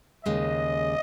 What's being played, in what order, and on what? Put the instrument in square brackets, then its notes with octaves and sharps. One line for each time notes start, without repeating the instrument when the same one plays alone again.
[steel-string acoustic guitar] D#2 C#3 G#3 [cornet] D#5